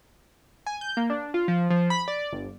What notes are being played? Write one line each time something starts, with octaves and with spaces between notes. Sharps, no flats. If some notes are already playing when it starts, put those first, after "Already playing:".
G#5
G6
A#3
D4
F4
F3
F3
B5
D5
G1